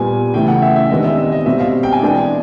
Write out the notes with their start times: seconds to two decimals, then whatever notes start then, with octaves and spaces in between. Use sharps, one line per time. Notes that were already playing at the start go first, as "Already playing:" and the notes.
Already playing: A#2 G3 B3 G#5
0.34 C#3 E3 A3 G5
0.48 F#5
0.62 E5
0.76 E5
0.89 C3 D#3 G#3 B3 D4 D#5
1.04 E5
1.18 E5
1.32 D#5
1.46 B2 G3 C4 E5
1.60 F5
1.83 G5
1.93 G#5
2.02 E3 G#3 B3 D4